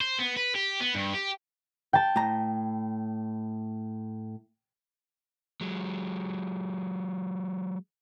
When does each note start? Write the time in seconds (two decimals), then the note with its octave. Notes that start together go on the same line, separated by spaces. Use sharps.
0.01 C5
0.19 B3
0.37 B4
0.55 G4
0.81 B3
0.95 G2
1.14 G4
1.93 G5 A5
2.16 A2 A#5
5.61 F#3 G#3